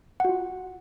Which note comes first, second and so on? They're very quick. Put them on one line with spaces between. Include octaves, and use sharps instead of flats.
F#5 F#4 F4